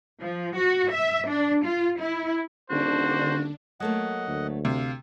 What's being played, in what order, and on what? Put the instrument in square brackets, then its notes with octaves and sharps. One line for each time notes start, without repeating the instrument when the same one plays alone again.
[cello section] F3
F#4
E5
D4
F4
E4
[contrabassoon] D#1 [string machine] D3 D4 [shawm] F#4 [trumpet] C5
[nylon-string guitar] F#3 A3 A#3 [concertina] D#5 F#5
[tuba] D2
[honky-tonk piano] C3 [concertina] F5